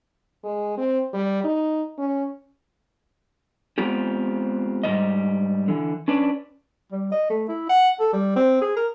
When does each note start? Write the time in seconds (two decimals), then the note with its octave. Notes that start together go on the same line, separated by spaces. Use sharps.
0.44 G#3
0.78 C4
1.13 G3
1.44 D#4
1.98 C#4
3.78 G#3 B3 C4 F4 G4
4.83 G#2 E3 G3 D#5
5.68 D3 E3
6.08 C#4 D4 B4 D5
6.92 G3
7.12 D#5
7.29 A3
7.48 E4
7.69 F#5
8.00 A4
8.13 G3
8.36 C4
8.61 G#4
8.76 A#4